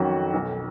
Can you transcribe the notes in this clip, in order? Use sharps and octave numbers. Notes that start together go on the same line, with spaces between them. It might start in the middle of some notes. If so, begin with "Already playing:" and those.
Already playing: F2 D#3 F#3 C#4 F#4
B1